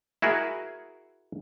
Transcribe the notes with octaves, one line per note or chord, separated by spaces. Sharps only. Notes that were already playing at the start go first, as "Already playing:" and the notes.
E4 F#4 G#4 A#4